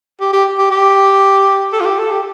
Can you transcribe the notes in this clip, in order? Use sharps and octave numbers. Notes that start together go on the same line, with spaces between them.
G4
G4
G4
G4
A4
F4
G4
A4
G4